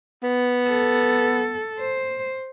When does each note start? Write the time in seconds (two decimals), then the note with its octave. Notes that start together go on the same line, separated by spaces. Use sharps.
0.23 B3
0.69 A4
1.79 C5